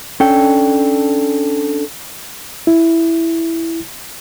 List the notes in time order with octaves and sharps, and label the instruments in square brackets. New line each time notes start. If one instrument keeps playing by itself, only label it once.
[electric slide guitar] C#4 D4 A4 G5
[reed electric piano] E4